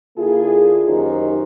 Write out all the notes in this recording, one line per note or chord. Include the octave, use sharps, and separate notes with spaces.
D3 A#3 E4 F4 G#4
F#2 D#3 D#4 G4 C5